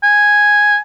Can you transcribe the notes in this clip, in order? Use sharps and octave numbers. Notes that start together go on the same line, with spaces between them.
G#5